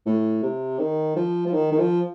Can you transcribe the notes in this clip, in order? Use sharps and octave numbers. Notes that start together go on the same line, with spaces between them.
A2
C3
D#3
F3
F3
D#3
D#3
F3